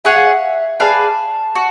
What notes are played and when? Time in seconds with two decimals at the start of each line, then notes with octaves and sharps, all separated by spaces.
0.04 G#4 C#5 E5 F#5
0.16 F5
0.27 E5
0.80 G#4 B4 D5 F5 A5
1.55 F#4